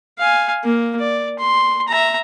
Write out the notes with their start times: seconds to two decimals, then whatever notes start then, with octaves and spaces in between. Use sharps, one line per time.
0.19 F5 G#5
0.64 A#3
0.99 D5
1.39 C6
1.88 E5 A#5